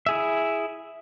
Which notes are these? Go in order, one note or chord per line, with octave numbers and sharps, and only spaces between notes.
E4 G#4 E5